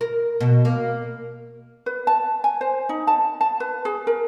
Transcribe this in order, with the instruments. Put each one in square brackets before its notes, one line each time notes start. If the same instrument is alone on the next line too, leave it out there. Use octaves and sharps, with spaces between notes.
[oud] A#4
B2
A#3
[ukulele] B4
A5
G#5
C5
D#4
A5
A5
B4
G#4
A#4